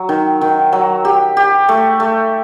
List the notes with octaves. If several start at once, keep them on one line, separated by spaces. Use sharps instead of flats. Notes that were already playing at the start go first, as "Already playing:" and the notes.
Already playing: F#3
D#3
D#3
F#3
G4
G4
A3
A3